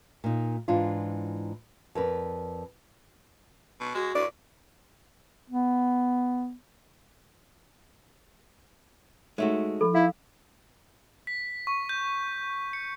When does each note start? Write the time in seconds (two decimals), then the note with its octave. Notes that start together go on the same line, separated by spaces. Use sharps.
0.24 A#2 D#4
0.68 G#2 E3 D4 F4
1.95 F2 A#4 B4 D5
3.80 B2
3.95 G#3 F#4
4.15 A2 D5
5.50 B3
9.38 G#3 A3 D#4 F#4 C#5 E5
9.81 F3 A4 B5
9.95 E4 F5
11.27 B6
11.67 C#6
11.89 G6
12.73 C#7